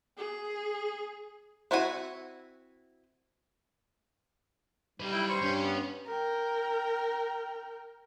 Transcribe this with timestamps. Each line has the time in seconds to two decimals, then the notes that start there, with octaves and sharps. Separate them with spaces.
0.18 G#4
1.71 C4 E4 F#4 A4 G#5
5.00 G3 D#4 B4
5.12 E4 G5
5.29 C5 C#6
5.42 G2 C#4
5.64 B3
6.07 A#4 G5